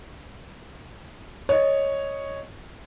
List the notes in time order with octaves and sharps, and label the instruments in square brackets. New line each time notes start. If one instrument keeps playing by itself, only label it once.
[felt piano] C#5 D#5